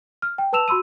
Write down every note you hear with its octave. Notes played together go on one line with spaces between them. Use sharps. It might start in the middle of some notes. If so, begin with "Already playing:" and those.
F6
G5
B4 A5 E6 E7 F7
F#4 B5 C6 E6 D#7